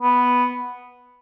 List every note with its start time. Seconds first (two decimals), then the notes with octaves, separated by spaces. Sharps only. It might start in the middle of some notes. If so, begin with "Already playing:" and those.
0.01 B3